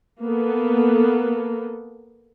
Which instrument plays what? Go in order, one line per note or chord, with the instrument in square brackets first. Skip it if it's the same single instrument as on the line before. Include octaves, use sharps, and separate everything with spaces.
[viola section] A#3 B3 A4